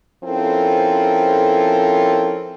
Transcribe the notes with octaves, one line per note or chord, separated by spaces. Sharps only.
F3 C4 C#4 E4 A4 A#4